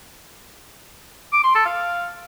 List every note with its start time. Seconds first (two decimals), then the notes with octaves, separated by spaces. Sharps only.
1.33 D6
1.44 C6
1.55 A4
1.66 F5